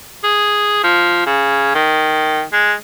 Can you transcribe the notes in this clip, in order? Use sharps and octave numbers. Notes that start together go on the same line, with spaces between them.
G#4
F3
C#3
D#3
G#3